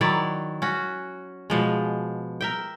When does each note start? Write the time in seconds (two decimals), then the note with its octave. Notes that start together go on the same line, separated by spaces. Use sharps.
0.01 D#3 F#3 E4 D5
0.62 C#4 F#4
1.50 B2 F3 G#3
2.41 A#4 E5 G5